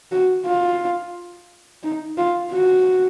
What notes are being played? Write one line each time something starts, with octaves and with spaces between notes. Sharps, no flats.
F#4
F4
D#4
F4
F#4